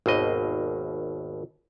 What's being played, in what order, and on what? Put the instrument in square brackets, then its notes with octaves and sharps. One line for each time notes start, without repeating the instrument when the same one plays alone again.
[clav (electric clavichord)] G#1 D#2 B2 D#5